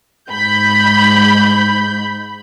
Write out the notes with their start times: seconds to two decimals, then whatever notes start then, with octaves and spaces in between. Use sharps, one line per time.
0.30 G#2 B5 G6